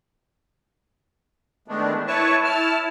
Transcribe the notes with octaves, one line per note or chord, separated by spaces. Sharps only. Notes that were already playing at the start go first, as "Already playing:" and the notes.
D#3 E3 G#3 A3 B3 D4
E4 B4 C#5 A5 C#6
E4 A5 F6